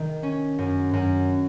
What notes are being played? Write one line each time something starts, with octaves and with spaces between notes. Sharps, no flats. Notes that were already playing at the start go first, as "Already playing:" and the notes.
Already playing: D#3
C#4
F#2
F#2